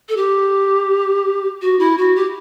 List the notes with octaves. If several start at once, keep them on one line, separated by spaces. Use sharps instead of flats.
A4
G4
F#4
E4
F#4
G4